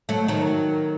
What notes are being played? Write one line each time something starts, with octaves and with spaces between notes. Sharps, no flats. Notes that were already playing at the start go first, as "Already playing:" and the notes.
F#3 A3
D#3 F#3